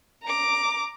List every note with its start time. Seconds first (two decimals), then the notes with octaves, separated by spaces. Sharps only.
0.23 A#5 D6